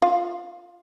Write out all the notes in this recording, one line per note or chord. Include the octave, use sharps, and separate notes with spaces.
F4 F5